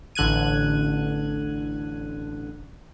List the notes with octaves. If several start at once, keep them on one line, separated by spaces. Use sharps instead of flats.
A1 D3 F#6 G#6 D#7